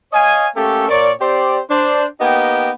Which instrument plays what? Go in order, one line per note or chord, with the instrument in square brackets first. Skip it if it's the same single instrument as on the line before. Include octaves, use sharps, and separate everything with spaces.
[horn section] C#5 D#5 F5 G#5
A3 A#3 C#4 G4 A4
A#2 A#4 C#5 D5
C4 G4 C5 D5
D4 C5
A#3 B3 D#4 G4 G5